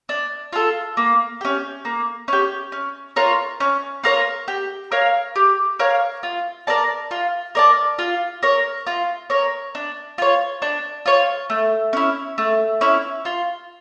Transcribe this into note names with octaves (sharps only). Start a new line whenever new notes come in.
D4
F4 A4
A#3
C#4 G4
A#3
C#4 G4
C#4
F4 A#4 C#5
C#4
F4 A#4 C#5
G4
A#4 C#5 F5
G4
A#4 C#5 F5
F4
A#4 D5 A5
F4
A#4 D5 A5
F4
A#4 C#5
F4
A#4 C#5
D4
F4 C#5
D4
F4 C#5
A3
C#4 E4
A3
C#4 E4
F4